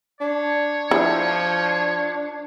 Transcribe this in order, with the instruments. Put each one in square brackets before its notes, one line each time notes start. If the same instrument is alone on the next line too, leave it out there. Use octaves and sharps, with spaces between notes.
[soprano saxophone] D4 [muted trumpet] C#5
[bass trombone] F3 [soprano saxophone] D4 [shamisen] E4